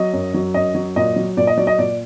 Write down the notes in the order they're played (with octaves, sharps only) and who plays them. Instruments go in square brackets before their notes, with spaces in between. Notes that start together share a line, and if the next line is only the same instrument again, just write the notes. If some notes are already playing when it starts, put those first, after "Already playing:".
Already playing: [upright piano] F#3 D#5
F#2
F#3
F#2 D#5
F#3
A#2 D#5
F#3
A#2 D5
D#5
F#3 D5
D#5
A#2 D5